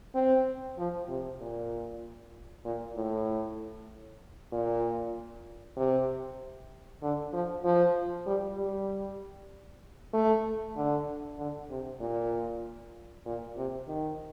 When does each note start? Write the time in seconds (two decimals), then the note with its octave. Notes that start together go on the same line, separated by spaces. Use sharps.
0.15 C4
0.78 F3
1.09 C3
1.40 A#2
2.65 A#2
2.96 A2
4.52 A#2
5.77 C3
7.02 D3
7.33 F3
7.64 F3
8.26 G3
8.57 G3
10.13 A3
10.76 D3
11.38 D3
11.70 C3
12.01 A#2
13.26 A#2
13.57 C3
13.88 D#3